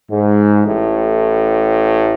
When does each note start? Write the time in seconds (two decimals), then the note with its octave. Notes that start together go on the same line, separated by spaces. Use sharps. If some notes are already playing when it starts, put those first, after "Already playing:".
0.11 G#2
0.65 A1 A2